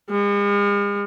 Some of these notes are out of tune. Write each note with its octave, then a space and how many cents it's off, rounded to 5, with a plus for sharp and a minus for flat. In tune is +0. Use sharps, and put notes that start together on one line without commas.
G#3 -45